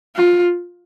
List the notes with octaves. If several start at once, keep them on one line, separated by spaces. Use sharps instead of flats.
F4